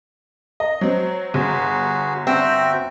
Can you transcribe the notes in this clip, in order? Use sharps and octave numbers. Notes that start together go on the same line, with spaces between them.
D#5
F#3 C4
G1 F#4 G#4
C4 F#4 E5 G5